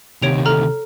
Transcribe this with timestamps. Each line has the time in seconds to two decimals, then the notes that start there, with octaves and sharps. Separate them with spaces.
0.22 D2 C3 D#3 C#5 D7 F7
0.46 A4 A#5 F6